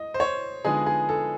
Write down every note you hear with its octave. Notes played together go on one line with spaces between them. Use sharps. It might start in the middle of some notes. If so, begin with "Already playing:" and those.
Already playing: D#5
C5
C#5
D3 F3 G#3 B3 D#4 G#4
G#4
A4